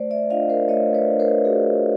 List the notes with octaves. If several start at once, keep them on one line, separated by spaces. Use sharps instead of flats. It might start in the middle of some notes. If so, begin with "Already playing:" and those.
Already playing: A3 C5 D5
D5 E5
D4 F4 D#5 F5
A#4 C5
A3 C#5 D#5
B4 C#5
D4 F4
A#4 C5
A3 F#4 G#4